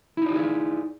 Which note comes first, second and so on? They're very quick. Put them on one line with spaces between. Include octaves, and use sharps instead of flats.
E4 D#4 D5 G4 G#4